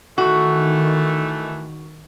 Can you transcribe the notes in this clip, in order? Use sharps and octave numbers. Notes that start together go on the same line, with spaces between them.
D#3 E3 A3 F#4